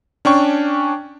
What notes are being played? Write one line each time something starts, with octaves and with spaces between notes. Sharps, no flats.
C#4 D4 G5 C#6